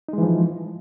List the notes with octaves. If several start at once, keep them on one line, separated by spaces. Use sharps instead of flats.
E3 F3 G#3 D#4